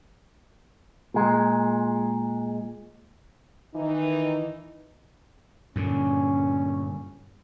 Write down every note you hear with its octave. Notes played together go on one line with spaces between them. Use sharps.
A#2 G#3
D#3 E3 D#4
G2 A#2 D3 C#4